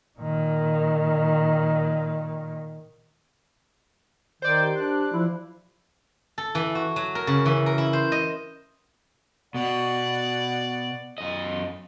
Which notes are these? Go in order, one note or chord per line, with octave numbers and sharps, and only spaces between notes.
A#2 D#3
D#3 C5 D5 G6
G4
D4 F#6
F3 E4
A4
E3
F#4
F#3
A#4
C#3
E3
A#4
E4
C5
D#5
B2 D5 F#5
F#2 D#5